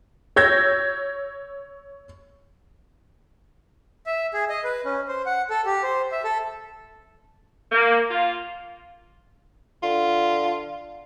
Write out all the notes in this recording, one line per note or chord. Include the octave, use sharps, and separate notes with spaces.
C#5 E6 G6 G#6 A#6
E5
G#4
D#5
B4
C#4
C5
F#5
A4
G4
C5
E5
A4
A#3
F4
D3 F4